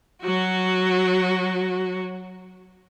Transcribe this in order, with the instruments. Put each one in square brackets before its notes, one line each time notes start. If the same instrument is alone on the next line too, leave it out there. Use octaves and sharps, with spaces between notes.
[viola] F#3 F#4